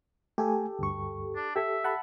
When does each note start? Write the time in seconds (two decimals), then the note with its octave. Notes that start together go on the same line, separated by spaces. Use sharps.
0.38 A3 G4 A4 G#5
0.79 D2 G2 C#6
1.36 D4
1.56 G4 A4 E5
1.84 F#5 A5 B5